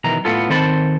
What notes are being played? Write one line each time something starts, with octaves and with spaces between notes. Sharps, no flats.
B1 D#3 E3 A#5
A2 B3 F4 A4
D#3 C4 A4 C5 A5 B5